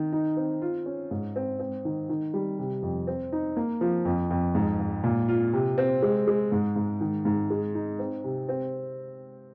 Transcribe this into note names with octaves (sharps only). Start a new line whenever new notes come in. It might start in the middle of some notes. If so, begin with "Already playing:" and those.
Already playing: D#3
D#4
C4
F4
C#4
G#2
C4
C4
D#3
D#3
G3
C3
F2
C4
D#4
A#3
F3
F2
F2
G#2
G#2
A#2
F4
C3
C4
G#3
G#3
G#2
G#2
D#3
G#2
G#3
D#4
C4
C3
C4